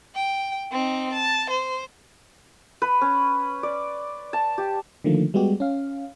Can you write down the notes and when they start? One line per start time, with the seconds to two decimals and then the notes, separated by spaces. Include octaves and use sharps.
0.15 G5
0.72 C4 D#4
1.13 A5
1.50 C5
2.82 B4
3.01 C#4
3.63 D5
4.33 A5
4.58 G4
5.04 D3 D#3 F3 A3 A#3
5.34 G3 G#3 B3 F#4 G4
5.60 C#4 F5